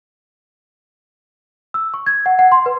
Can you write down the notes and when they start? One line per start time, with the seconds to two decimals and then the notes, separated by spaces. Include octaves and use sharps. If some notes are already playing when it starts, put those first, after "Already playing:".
1.74 E6
1.94 C#6
2.06 G#6
2.26 F#5
2.39 F#5
2.52 C6
2.66 B4